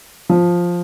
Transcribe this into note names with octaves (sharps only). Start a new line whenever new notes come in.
F3